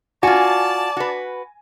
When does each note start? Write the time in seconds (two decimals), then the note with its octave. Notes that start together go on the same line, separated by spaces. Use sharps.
0.23 F4 F#4 D5 G#5 A5
0.97 F#4 B4